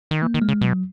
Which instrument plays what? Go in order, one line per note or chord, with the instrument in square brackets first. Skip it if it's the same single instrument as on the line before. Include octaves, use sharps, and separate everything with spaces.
[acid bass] D#3
[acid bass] E3 [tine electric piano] A#3
[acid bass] D#3
[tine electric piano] G#3
[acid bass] C#3
[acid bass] B2 [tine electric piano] F#3